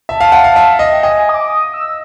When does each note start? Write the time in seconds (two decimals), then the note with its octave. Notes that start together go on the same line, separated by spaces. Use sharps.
0.09 E5 A5
0.21 F5
0.32 F#5
0.44 F5
0.56 E5
0.79 D#5
0.91 G5
1.03 D#5 G#5
1.18 G#5
1.29 D#6
1.34 D6
1.50 D#6
1.74 E6